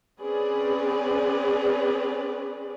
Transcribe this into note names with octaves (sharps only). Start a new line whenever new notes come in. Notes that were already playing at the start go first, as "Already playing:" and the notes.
C4 C#4 G#4 B4 D5